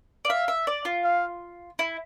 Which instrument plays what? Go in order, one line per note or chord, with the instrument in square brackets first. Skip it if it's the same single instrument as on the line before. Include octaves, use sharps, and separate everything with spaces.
[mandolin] D5
[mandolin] E5 [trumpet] F5
[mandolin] E5
D5
F4
[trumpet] F5
[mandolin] E4